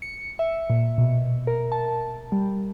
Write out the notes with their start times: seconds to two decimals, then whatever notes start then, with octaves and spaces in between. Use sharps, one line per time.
0.02 C#7
0.39 E5
0.70 A#2
0.98 B2
1.47 A#4
1.72 A5
2.32 G3